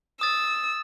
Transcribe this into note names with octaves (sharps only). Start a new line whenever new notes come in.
D#6 E6 A6